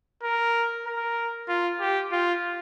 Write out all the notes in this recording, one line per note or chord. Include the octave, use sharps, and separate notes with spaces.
A#4
A#4
F4
G4
F4